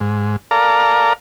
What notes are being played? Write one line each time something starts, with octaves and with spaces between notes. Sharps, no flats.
G#2
A4 A#4 D5 F5 A#5